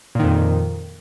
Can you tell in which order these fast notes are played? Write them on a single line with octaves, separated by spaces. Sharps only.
A#2 D#3 F2